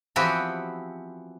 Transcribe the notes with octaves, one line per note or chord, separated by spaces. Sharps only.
E3 F3 B3 C4 F#4 G4